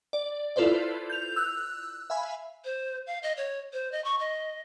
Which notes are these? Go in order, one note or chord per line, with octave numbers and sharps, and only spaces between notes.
D5
E4 F4 A4 B4 C5 D5
G6 F7
E6 F#6
E5 F5 G#5 B5
C5
F5
D#5
C#5
C5
D#5
C#6
D#5